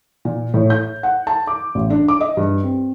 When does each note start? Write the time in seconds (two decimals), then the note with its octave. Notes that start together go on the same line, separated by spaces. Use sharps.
0.25 A#2
0.54 A2
0.70 G6
1.03 F#5
1.27 A5
1.47 D6
1.75 A1
1.90 D4
2.08 D6
2.21 D#5
2.37 G2
2.64 C4